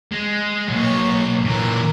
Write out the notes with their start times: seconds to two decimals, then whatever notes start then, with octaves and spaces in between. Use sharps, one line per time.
0.12 G#3
0.68 B1 F#3 A#3 C#5
1.45 A#2 E3 A#4